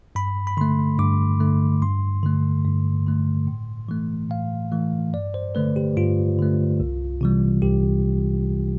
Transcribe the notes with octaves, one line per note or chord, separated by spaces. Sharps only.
G2 B5
B5
D3 A3 C6
G2 D6
D3 A3
G2 C6
D3 A3
G2
D3 A3
A2
E3 A3
A2 F5
E3 A3
G2 D5
C5
D3 A3 B4
G4
G2 F4
D3 A3
C2
C3 E3 G3
C2 G4